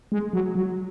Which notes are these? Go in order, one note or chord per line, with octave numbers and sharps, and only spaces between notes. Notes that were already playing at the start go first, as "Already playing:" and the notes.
G#3
F#3
F#3